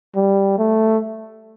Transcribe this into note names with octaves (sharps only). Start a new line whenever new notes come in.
G3
A3